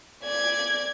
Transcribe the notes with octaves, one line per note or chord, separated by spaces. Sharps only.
D5 G#6